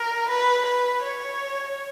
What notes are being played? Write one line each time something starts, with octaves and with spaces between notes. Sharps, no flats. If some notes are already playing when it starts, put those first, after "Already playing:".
Already playing: A#4
B4
B4
C#5